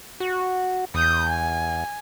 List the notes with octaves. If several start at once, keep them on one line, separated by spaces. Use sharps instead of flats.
F#4
E2 D#6 G6
G#5